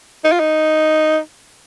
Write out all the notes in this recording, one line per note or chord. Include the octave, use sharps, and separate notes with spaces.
D#4
F4
D#4